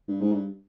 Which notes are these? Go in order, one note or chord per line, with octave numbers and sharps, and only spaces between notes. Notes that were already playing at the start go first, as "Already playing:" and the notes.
G2
G#2
G2